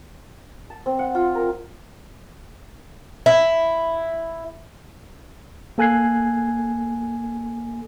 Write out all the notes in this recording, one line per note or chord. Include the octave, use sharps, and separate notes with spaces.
A5
C4
F#5
F4
A#4
E4
A#3 A4 G#5 F#6 G#6 C7